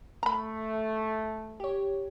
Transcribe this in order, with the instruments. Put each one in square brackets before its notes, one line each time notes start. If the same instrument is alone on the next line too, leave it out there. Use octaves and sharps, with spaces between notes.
[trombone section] A3 [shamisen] A#5 B5
[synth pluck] G4 C#5